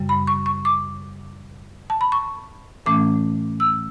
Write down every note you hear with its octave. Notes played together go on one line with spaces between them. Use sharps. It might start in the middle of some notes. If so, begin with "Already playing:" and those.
Already playing: F#2 C#3 G3
B5
C#6
C#6
D6
A5
B5
C#6
A2 E3 A3 C#4 D6
E6